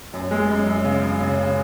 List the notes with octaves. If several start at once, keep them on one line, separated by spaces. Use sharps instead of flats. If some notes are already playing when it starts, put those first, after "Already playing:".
F#2
G#3
F#2
F#2
C#3
F#2
C#3
C#3